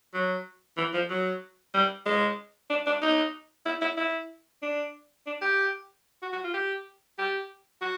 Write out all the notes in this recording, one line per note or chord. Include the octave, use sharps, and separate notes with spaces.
F#3
E3
F3
F#3
G3
G#3
D4
D4
D#4
E4
E4
E4
D4
D4
G4
F#4
F#4
F4
G4
G4
F#4